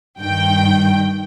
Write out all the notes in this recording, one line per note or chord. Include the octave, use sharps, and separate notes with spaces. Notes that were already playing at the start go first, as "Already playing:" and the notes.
G2 D#3 G5